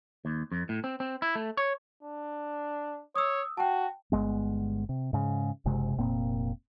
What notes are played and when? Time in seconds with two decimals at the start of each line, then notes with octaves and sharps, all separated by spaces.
0.25 D#2
0.52 F2
0.69 A2
0.84 C4
1.00 C4
1.22 E4
1.35 A3
1.57 C#5
2.03 D4
3.16 C#5 D#6 E6
3.58 F#4 G5 A5
4.12 G1 F#2 G#3 B3
4.89 C3
5.13 G#2 C#3
5.66 F#1 C3 G#3
5.98 F1 A#2 A#3 C4